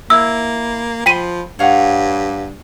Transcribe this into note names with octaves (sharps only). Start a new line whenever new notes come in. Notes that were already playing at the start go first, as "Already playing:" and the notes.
A#3 E4 E6
F3 G5 B5 C6 B6 D#7
G2 C#5 F5 F#5